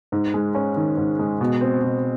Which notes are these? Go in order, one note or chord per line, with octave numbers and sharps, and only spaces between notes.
G#2
G#3
C#4
D#3
G#2
G#3
B2
C4
B2